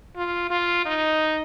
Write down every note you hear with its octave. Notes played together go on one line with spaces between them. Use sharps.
F4
F4
D#4